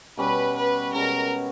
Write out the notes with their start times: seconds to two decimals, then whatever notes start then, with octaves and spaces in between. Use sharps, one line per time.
0.17 B2 G3 C#4 B4
0.56 B4
0.94 B2 G#3 C#4 A#4